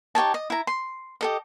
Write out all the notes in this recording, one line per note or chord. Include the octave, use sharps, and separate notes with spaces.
D#4 G4 C#5 A5
D#5
E4 A#5
C6
G4 A4 D#5